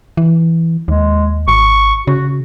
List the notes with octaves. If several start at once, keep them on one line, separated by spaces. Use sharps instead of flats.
E3
D#2 G#3
G#1 C#6
C#3 F#4